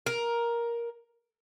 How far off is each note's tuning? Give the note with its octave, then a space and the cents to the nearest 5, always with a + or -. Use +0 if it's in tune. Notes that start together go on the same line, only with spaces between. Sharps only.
A#4 +10